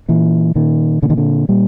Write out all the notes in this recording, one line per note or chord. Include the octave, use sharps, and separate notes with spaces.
A#2 E3
A#2 D#3
A#2 D3
D#3
D3
A#2 G3